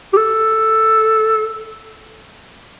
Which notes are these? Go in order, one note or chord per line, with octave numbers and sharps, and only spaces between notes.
G4
A4